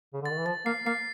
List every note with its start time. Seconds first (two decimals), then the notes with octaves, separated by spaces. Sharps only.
0.14 C#3
0.22 D3
0.26 D#3 A6
0.38 E3
0.46 F3 A6
0.66 A#3 C7
0.86 A#3 C7